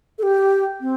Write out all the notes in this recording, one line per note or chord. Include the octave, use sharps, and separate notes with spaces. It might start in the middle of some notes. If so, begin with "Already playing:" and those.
A4
G4
C4